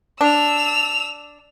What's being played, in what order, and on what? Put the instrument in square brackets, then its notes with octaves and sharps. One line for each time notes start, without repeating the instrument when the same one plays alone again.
[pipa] D4 [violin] E6 F7